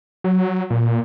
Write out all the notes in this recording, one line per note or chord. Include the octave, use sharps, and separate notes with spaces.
F#3
A#2